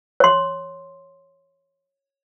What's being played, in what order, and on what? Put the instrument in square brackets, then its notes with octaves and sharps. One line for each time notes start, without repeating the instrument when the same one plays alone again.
[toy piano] C#5 C6